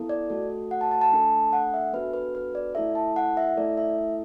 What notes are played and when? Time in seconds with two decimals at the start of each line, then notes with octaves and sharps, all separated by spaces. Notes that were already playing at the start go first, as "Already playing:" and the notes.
Already playing: B3 E4 A4
0.09 D5
0.30 A3 F#4 A4
0.71 F#5
0.81 A5
0.91 A5
1.01 A5
1.12 A3 D4 A4
1.53 F#5
1.74 E5
1.93 B3 D4 F#4 A4 B4
2.13 B4
2.35 B4
2.55 D5
2.75 A3 E4 A4 E5
2.95 A5
3.16 F#5
3.37 E5
3.57 A3 E4 A4 D5
3.77 E5